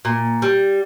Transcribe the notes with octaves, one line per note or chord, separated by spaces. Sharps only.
A#2
G3